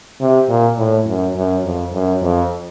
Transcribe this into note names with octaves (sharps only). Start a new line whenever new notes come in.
C3
A#2
A2
F#2
F#2
F2
F#2
F2